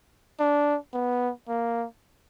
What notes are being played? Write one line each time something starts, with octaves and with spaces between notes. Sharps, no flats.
D4
B3
A#3